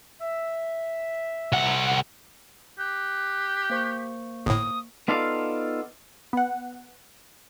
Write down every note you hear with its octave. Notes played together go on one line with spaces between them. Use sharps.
E5
C2 F#5
G4 F#6
A#3 C5 C#6
G1 A2 D#6
B3 D#4 F4 A4 D5 F5
B3 F#5